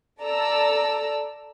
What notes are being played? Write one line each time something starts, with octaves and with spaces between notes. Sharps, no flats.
A4 D5 A5 A#5 E6